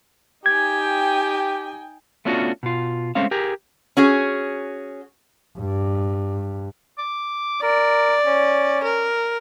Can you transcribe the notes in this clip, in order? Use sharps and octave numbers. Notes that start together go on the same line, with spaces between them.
D#4 G4 G5 G#5 G#6
A3 B3 C#4 D4 F4 F#4
B2 F4
G#3 A3 C4 C#4 F5
G4 G#4 A#4
C#4 F#4 G#4
G2
D6
A#4 D5
C#4
A#4